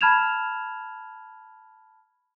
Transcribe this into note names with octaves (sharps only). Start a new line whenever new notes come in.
A5 B5 F6 G#6 E7 F7